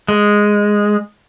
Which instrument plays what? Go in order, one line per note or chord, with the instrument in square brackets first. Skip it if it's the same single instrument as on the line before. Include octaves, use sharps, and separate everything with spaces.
[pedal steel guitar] G#3